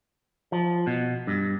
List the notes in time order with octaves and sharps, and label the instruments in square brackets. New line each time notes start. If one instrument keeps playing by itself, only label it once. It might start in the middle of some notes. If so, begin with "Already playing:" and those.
[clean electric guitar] F3
B2
G2